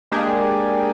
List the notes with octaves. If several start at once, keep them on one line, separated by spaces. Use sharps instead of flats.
G#3 A#3 D4 G4 G#4